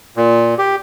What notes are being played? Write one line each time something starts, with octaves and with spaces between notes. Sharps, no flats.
A#2
G4